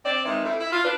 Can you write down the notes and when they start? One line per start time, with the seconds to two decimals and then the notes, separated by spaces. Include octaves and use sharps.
0.05 C4 D5
0.25 D#3 E3 G#3 C4
0.45 G3 A3 C4 E4
0.60 E4
0.72 F4
0.84 D4 B4